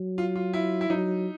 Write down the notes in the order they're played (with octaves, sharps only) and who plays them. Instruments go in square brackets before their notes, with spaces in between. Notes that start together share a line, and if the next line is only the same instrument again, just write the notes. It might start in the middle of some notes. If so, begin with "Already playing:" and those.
Already playing: [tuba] F#3
[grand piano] F4
F4
E4
E4
[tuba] F#3 [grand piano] D#4